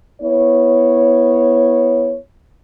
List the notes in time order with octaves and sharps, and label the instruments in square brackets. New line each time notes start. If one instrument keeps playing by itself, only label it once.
[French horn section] B3 E4 C#5